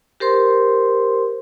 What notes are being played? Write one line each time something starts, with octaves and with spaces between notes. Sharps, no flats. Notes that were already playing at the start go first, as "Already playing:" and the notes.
G4 A#4 C5 C6